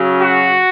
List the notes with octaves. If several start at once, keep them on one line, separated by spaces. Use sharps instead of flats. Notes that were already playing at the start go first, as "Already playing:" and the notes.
Already playing: C#3 F#3
F#4